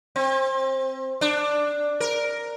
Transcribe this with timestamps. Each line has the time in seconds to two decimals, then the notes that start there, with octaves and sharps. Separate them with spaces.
0.16 C4
1.21 D4
2.00 A#4